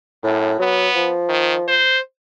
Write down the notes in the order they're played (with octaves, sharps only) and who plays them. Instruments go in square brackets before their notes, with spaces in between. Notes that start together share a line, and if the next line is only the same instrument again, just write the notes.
[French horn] F#2 [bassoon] A2
[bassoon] F#3 [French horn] B3
[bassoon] F3
[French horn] D#3
C5